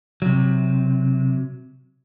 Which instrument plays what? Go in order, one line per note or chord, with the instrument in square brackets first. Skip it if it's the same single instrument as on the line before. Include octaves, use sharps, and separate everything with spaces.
[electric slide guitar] C3 F#3